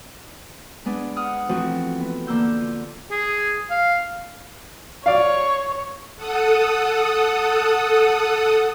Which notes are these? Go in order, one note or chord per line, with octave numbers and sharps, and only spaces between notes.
G#3 B3 D4
F#5 D#6 F6
E3 F3 A3 C4 F#4
B3
D3 A#3 E6 G6
F4
G#4
F5
C#5 D5 F5
A4 F#5 D#6